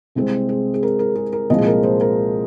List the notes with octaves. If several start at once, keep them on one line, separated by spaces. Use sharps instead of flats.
C2 C3 G#3 C4
G#4
G#4
A#4
A#4
G#4
A#4
C2 A#2 F3 G#3 D#5
G#4
A#4
C5
A#4